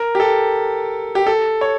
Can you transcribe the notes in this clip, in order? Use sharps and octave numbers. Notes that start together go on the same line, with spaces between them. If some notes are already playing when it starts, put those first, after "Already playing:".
Already playing: A#4
G4
A4
G4
A4
C#5